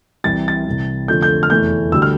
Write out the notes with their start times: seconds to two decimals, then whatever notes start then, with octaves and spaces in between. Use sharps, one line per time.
0.24 C2 C3 E3 G3 A6
0.48 A6
0.66 C2 C3 E3
1.08 F2 D3 F3 A3 G6
1.22 G6
1.43 F6
1.50 F1 E2 E3 A3 G6
1.92 D2 D3 G3 E6
2.02 F6